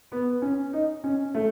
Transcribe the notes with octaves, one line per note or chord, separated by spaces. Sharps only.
B3
C#4
D#4
C#4
A3